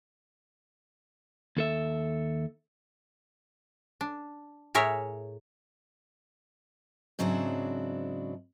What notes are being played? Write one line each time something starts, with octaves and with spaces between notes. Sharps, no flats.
D#2 A4 E5
D4
A2 G#4 A#4 C#5 E5
G#2 C#3 F#3 C4 D4 E4